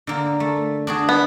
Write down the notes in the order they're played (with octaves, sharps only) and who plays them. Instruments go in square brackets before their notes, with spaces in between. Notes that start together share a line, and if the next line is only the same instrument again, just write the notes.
[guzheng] D3 A#3
A3
D4 F#4 G#4
[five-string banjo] B3